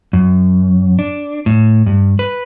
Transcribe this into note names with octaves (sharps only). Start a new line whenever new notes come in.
F#2
D4
A2
G2
B4